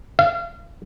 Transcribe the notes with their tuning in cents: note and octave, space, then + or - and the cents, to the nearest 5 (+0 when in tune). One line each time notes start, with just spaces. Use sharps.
F5 -35